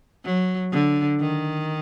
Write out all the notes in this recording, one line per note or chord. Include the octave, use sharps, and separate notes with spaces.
F#3
D3
D#3